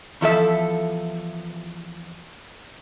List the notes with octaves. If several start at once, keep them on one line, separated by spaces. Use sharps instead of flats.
E2 F3 A4 E5